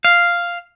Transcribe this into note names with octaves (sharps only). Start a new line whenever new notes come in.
F5